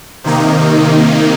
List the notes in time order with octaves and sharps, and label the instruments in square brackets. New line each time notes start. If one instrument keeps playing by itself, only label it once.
[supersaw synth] C3 D#3 A#3 D#4